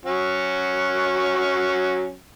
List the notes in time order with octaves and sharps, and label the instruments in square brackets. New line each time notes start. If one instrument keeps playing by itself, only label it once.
[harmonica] F#3 C#4 F#4